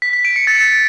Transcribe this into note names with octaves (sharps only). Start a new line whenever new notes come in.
B6
B6
D7
C#7
A6